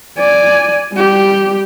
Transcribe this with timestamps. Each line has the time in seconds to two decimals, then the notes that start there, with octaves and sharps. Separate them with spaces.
0.18 D5 G#5
0.93 G3 G4